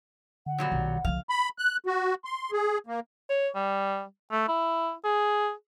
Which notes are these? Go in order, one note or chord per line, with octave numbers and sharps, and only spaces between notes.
D3 F#5
A#2 F#3 G3
B1 D#3
C2 D3 F3 F5
B5
F#6
F#4
C6
G#4
A#3
C#5
G3
A3
E4
G#4